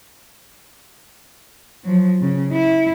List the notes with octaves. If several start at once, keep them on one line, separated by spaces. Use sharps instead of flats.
F3 F#3
C#3
E4